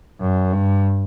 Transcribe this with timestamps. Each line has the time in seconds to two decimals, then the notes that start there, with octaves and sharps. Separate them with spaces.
0.20 F#2
0.53 G2